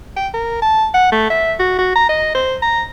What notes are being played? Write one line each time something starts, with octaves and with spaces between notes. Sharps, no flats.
G5
A#4
A5
F#5
A3
E5
F#4
F#4
A#5
D#5
C5
A#5